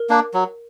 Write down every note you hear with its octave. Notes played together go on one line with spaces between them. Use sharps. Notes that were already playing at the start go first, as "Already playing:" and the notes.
Already playing: A#4
A#3 D4
F#3